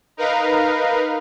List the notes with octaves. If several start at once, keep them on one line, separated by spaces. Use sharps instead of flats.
D#4 A#4 B4 F5